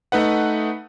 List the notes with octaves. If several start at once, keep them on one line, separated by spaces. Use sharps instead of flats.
A3 D#4 B4 F#5